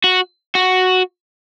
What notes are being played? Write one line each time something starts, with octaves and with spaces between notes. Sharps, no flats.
F#4
F#4